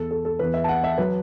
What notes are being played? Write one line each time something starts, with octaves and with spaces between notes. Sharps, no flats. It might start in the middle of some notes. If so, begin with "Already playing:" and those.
Already playing: E2 E3 A4
A4
A4
E2 E3 B4
E5
A5
F#5
E5
F#3 B4